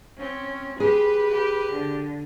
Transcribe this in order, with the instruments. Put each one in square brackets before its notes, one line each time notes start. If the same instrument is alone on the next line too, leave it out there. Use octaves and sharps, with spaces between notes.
[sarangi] C4 [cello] C#4
[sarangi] G4 [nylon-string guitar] G#4 [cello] B4
[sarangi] G4
[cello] D3